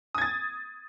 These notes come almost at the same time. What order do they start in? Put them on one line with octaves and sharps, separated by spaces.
D#6 G#6 A6